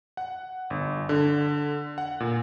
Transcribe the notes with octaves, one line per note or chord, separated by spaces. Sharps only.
F#5
G1
D3
F#5
A#2